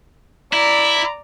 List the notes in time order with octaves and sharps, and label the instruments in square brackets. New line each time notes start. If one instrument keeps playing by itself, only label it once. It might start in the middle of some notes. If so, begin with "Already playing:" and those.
[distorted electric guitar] E4 [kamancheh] D5 A#5